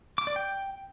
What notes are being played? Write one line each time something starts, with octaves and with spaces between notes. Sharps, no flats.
D6
D5
G5